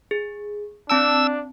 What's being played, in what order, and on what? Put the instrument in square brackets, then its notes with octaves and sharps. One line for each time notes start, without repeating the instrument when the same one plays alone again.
[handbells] G#4
[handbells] C4 A5 D7 [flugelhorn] D4 [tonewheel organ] E6